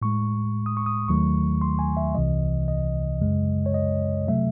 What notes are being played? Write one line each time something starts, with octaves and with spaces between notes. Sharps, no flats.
A2 G#3 C#6
D#6
C#6
D#6
D#2 D#3 F#3 A3 C#6
C6
G#5
E5
C2 C3 E3 D#5
D#5
F#2 C#3 G#3
C#5
D#5
C3 F#3 A3 E5